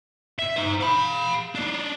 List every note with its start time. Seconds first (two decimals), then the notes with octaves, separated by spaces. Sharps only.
0.39 E5
0.56 D#4 C5
0.81 F5 B5
1.55 D4 D#4